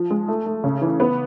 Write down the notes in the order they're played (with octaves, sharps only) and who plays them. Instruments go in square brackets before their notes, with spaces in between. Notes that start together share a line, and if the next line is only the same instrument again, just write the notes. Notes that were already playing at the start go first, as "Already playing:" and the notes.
Already playing: [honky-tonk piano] F3
G#3
A3
A3
C#3
E3
B3